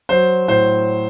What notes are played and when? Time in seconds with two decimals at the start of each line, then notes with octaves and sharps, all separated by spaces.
0.09 F#3 C5
0.48 A2 C5